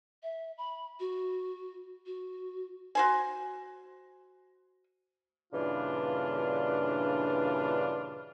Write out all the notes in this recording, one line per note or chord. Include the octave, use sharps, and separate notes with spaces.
E5
B5
F#4
F#4
F#4 C5 G#5
G2 A#2 C#3 E3 D4 F4